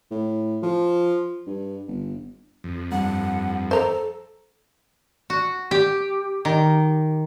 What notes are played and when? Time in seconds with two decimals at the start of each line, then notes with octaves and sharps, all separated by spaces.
0.11 A2
0.63 F3
1.47 G2
1.88 G1
2.64 F2
2.92 G2 F#5
3.71 A4 C5 A#5
5.30 F#4
5.71 G4
6.45 D#3